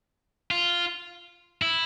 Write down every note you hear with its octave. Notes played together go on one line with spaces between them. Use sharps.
F4
E4